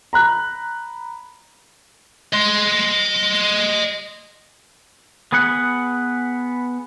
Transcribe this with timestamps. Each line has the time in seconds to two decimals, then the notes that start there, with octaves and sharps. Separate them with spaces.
0.13 A#5 B5 F#6
2.33 D#5 C6
5.32 B3 G#4 B4 F#5